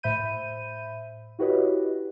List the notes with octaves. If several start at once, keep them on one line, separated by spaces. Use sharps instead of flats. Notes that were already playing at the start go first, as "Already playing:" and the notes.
A2 C5 E5 B5 G6 D#7
E4 F#4 G4 B4 C#5 D#5